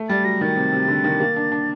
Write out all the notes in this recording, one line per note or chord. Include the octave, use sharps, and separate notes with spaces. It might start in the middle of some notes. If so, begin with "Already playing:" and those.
Already playing: A3
G3 A6
F#3 A#6
D#3 A6
C3
C3
D3
D#3
A#3
D4
D4